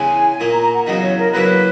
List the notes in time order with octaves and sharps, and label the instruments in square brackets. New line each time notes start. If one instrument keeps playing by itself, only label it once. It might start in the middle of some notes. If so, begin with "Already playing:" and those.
Already playing: [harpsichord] E2 C#3 G#3 [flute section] G#5
[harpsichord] A#2 A#3 D#4 [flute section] G#5
[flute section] A#5
A#5
F#5
[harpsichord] E2 C#3 F#3 B3 D#4 [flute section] D#5
[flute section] C#5
A#4
[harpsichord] C#3 F#3 A#3 E4 [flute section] B4